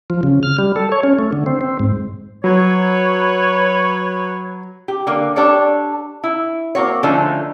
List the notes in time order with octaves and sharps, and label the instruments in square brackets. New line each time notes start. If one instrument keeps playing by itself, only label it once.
[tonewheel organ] F3
C#3
F6
G3
A4
C#5
C#4
A3
D3
C4
C4
G#2
[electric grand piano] F#3 [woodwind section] B4 C#5
[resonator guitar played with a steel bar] G4
D3 A#3
D4 G4 A4 C#5 D5
E4
A#3 C4 F#4 C#5
D3 F3 A3 C#4 D#4